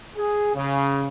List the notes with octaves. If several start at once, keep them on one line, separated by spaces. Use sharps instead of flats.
G#4
C#3